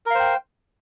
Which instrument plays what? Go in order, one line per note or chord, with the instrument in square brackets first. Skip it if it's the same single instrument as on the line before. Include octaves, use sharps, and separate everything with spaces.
[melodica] A#4
F5
C5
G5